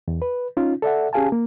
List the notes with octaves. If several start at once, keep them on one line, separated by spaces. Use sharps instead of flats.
E2
B4
C#4 D#4 F4
A4 D5 E5 F#5
C#4 G4 G#4 F5 G#5 A5
A#3